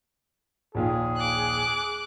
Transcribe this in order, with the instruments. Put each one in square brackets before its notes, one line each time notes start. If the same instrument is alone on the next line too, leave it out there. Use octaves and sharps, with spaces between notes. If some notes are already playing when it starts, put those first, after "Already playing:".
[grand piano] A#1 D#2 F4 [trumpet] G#4
[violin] D6 F#6